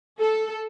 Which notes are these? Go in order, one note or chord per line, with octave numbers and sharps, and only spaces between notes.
A4